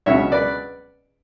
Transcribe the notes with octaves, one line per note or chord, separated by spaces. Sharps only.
C#2 B2 F#3 C#4 C#5 E5
B4 D5